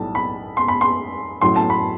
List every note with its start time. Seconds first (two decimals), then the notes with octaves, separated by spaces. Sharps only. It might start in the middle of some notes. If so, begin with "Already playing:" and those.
Already playing: B1 A2 G3 A5
0.15 B5
0.57 C6
0.68 B5
0.81 C6
1.42 A1 A2 F#3 C6
1.56 A5
1.70 B5